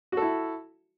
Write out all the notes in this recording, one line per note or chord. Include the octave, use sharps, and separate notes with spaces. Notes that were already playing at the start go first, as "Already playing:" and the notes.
E4 F#4 A4